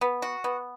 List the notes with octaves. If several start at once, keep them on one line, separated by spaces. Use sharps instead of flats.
B3
F#4
B3